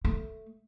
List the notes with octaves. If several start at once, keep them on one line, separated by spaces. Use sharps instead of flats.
A3